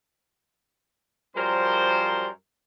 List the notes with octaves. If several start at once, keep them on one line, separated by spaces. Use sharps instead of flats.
F#2 F3 G3 A#4 C5